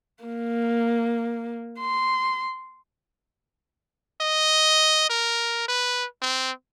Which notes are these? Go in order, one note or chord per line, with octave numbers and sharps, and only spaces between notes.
A#3
C6
D#5
A#4
B4
C4